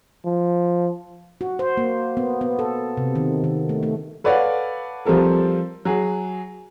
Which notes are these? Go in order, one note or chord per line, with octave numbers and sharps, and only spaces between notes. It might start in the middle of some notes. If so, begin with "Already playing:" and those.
F3
F#4
C5
A#3
B3
B3
A4
C3
D#3
D#3
A3
A3
A4 B4 C#5 D5 F5 F#5
F3 G3 C4 A4 A#4
F#3 G#4